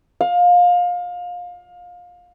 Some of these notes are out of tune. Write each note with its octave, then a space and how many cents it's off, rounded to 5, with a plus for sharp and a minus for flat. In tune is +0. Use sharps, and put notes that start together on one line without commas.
F5 +25